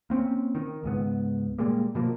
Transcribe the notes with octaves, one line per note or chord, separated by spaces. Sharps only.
A#3 C4 C#4
D#3
C#2 G#2 B3
A#2 G3 G#3 A#3
B2 F3 A#3